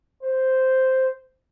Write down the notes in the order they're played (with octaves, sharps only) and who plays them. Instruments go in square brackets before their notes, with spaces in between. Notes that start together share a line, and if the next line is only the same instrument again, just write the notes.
[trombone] C5